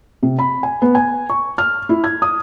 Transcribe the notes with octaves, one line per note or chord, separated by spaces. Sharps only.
C3
B5
G#5
B3
G#5
C#6
F6
E4
G#6
D#6